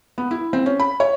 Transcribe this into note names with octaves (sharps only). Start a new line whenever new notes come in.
B3
E4
C4
C#4
B5
C#5